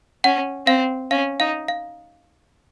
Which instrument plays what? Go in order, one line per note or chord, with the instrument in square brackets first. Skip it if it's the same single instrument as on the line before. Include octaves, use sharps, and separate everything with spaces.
[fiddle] C#4 [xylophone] F#5
[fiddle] C4 [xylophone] F5
[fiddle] C#4 [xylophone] F5
[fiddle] D#4 [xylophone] F5
[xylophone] F5